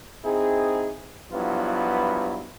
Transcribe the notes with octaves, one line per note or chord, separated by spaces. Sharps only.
C4 D#4 E4 G#4
G2 F3 F#3 B3 E4 F4